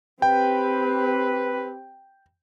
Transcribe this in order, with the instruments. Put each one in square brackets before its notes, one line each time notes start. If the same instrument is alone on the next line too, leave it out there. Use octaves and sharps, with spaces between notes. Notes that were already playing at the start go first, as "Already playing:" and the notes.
[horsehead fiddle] C4 G4 [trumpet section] B4 [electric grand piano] G5